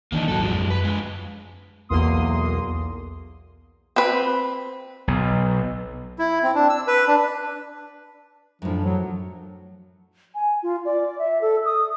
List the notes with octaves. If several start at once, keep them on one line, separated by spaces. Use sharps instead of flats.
B1 D#3 E3 A#3 D4 D#4
D#1 G#1 F#3 F#4 A4
F3 G#3
F#2
B4
D3 G#3
B1 E2 A#3 C6 D#6
C4 B4
B1
E4
C4
D4
E6
B4
D4
F#2 A2 F3 D4
F3 F#3
G#5
F4
D5
E5
A4
D#6